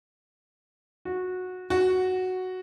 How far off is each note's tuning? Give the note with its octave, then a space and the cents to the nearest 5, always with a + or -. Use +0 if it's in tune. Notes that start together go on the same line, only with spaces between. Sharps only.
F#4 -15
F#4 +0